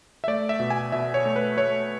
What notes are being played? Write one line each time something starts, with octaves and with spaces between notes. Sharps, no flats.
E5
A3 D5
E5
B2
G#5
B2 E5
C#5
A3
B4
A3 C#5